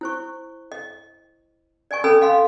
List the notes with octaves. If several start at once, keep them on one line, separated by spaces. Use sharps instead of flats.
E4 C5 C#6
D#5
D5 D#5 G#5 C#6
C#4 A4 G#5 B5 E6
D#5 F5 B5 C6